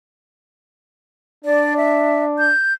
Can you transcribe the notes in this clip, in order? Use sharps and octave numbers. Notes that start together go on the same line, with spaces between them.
D4 D5
E5
G6